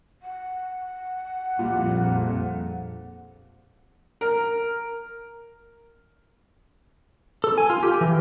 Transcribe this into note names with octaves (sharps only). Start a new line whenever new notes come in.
F#5
A#1 F2 A#2 G3
A#4
A4
G#5
F4
G4
E3